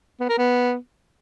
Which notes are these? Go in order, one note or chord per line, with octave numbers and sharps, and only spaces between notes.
B3
A#4
B3